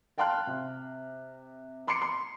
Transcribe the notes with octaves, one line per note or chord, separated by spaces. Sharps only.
F5 G5 A5 C6 F6 F#6
C3
B5 C6 D6 C7 C#7
C6